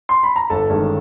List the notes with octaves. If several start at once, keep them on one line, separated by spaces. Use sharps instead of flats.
C6
B5
A#5
G1 A4 A5
G2 D#3 G#3 C#4